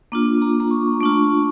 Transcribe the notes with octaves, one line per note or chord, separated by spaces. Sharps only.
A#3 D4 F4 D6
A#5
A#5
C#6
A3 D4 F4 C#6